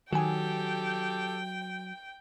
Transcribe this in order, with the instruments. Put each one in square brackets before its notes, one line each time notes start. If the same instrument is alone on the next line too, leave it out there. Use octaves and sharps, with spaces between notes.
[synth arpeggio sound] D#3 G#5 [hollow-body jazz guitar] F#3 [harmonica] G4 A4 [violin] G5